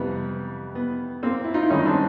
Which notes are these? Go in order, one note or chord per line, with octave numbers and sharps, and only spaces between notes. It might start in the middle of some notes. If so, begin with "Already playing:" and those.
Already playing: F2 C3 E3 G3 B3
B3
A#3 C4
E4
D#4 F4
E4
G2 D#3 G#3 C#4 D#4
C4 D4